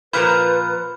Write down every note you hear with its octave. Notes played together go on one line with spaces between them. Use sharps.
A#2 F3 A#4 B4 B5 F6